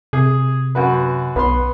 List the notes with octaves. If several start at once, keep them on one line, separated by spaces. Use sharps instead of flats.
C3 G#4
F#2 F#4 B4
B1 B3 B4 C6